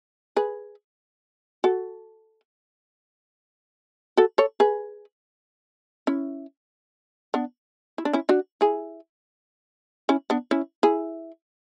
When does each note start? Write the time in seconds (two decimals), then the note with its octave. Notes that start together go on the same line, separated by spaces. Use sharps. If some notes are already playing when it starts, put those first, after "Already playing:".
0.36 G#4 B4
1.64 F#4 A4
4.17 F#4 A4
4.38 A4 C#5
4.60 G#4 B4
6.07 C#4 E4
7.34 B3 D4
7.98 E4
8.05 D4
8.13 C#4 E4
8.29 D4 F#4
8.61 E4 G#4
10.09 C#4 E4
10.30 B3 D4
10.51 C#4 E4
10.83 E4 G#4